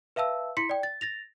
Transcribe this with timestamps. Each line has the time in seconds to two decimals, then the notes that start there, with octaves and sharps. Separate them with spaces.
0.16 B4 E5 F5 A5 E6
0.57 E4 C6 B6 C#7
0.69 D5 G5
0.83 A6
1.01 A6 A#6 F7